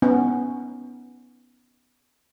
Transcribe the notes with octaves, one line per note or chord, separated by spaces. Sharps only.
B3 C#4 D#4